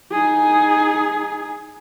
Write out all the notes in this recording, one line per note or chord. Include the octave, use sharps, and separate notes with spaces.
D#4 G#4